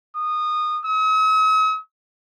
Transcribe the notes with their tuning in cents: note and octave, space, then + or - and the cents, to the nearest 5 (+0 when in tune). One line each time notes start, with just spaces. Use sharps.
D#6 -20
D#6 +45